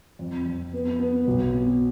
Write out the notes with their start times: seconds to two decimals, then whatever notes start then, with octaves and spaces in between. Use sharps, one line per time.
0.19 F2
0.46 F2
0.73 B3
0.99 B3
1.27 B1
1.53 B2